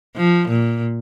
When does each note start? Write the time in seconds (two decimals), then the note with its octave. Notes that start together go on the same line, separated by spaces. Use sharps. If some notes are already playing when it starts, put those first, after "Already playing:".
0.17 F3
0.48 A#2